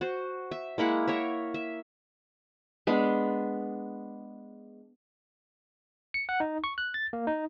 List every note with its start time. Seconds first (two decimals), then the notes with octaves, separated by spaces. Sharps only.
0.01 F#4 C5
0.51 E5
0.78 G#3 A#3 E4 F#5
1.08 A#4 C#5 E5
1.54 E5
2.87 G#3 B3 D4
6.14 C#7
6.29 F#5
6.40 D#4
6.64 C#6
6.78 F#6
6.94 A6
7.13 A#3
7.27 D#4